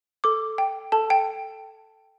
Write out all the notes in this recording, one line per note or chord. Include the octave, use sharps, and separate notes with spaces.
A4 D6
G5
A4 A5
G5